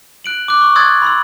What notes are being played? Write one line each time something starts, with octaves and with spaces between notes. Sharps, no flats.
F#6 D7 F#7
D6 F#6
C#6
C6 D#6 E6 F#6 G#6 A6
B5 C6 E6